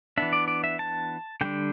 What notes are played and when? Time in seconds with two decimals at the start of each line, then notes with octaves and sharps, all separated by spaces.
0.18 E3 B3 D4 E5
0.33 D5
0.48 D5
0.64 E5
0.79 A5
1.41 D3 G3 D4 G5